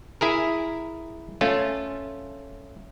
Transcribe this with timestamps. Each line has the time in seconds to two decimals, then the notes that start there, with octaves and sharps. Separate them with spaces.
0.21 E4 G#4 A#4
1.41 A3 C#4 F4